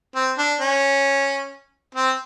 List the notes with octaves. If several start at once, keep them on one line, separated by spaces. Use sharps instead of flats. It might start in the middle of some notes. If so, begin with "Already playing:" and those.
C4
D4
C#4
C4